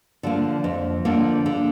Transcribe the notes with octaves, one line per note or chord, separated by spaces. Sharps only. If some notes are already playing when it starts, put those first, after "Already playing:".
D3 F3 A#3
F2
D3 F3 A#3
D3